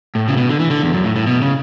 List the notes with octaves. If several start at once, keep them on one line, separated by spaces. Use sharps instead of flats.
A2
C#3
B2
D3
E3
D3
E2
F#2
A2
A2
B2
C#3